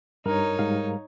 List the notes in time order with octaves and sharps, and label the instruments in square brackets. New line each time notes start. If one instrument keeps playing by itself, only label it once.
[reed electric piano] G2 A#5 [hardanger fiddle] D#4 C#5 [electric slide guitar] A#4
[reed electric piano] G#2 G3 F5